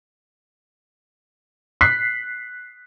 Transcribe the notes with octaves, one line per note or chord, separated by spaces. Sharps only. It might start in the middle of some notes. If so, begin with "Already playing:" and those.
F#6 B6 C7